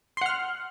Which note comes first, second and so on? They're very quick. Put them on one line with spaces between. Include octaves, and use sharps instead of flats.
C6 F#5 F6